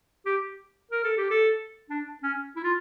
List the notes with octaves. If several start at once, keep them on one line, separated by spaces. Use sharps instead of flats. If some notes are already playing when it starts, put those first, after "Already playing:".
G4
A#4
A4
G4
A4
D4
C#4
E4
F4